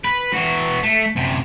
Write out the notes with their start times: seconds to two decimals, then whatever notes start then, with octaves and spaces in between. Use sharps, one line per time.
0.04 B4
0.33 E3 F#4
0.83 A3
1.16 F#2 C3